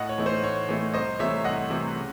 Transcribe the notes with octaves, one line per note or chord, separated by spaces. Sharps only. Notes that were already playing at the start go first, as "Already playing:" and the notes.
Already playing: A2 D#5 F#5
C#5
E3 A3 D#4
C5
A2 C#5
E3 A3 D#4
C2 C5 D#5
C3 E3 A3 C#5 E5
C2 D#5 F#5
C3 E3 A3
C#3